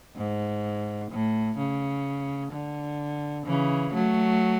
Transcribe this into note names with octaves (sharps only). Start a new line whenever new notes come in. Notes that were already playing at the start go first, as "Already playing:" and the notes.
G#2
A2
C#3
D3
C#3 E3
F#3 A3